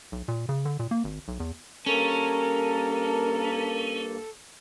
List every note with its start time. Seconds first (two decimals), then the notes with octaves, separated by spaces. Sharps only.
0.12 B1
0.28 A#2
0.49 C#3
0.65 D3
0.79 A#2
0.91 A#3
1.04 G#1
1.28 B1
1.40 E2
1.86 G2 A#3 C#4 A4 A#4 A5